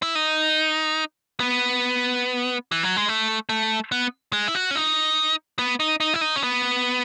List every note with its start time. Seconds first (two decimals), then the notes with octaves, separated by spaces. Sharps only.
0.03 E4
0.15 D#4
1.40 B3
2.72 E3
2.83 F#3
2.97 G#3
3.09 A3
3.49 A3
3.92 B3
4.33 G#3
4.48 E4
4.55 F#4
4.71 C#4
4.75 D#4
5.59 B3
5.80 D#4
6.00 D#4
6.14 E4
6.21 D#4
6.36 C#4
6.43 B3